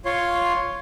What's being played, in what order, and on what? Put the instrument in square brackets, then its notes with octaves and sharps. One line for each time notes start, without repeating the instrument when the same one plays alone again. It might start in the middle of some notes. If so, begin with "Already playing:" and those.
[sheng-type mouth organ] F4 C#5 C6